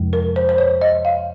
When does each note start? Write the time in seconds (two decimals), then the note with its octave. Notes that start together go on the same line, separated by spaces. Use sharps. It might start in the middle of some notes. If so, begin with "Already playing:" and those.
Already playing: F2 C3 F3 G#3
0.13 A#4
0.36 C5
0.49 C5
0.58 C#5
0.81 D#5
1.05 F5